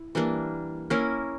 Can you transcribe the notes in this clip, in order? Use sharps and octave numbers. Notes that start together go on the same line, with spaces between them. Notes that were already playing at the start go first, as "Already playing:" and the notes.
Already playing: E4
E3 G3 A#3 D4
A#3 C#4 E4 A#4